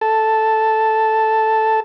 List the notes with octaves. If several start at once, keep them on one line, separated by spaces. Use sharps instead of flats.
A4 A5